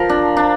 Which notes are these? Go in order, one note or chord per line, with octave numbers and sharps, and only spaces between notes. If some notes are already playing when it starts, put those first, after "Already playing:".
Already playing: F3 A#4
D4
D4